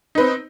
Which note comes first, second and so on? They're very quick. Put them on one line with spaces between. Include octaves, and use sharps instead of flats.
D#4 B4 C4